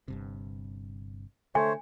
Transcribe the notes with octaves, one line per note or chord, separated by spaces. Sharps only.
G1 G2 C3
D3 A3 C5 C#5 G#5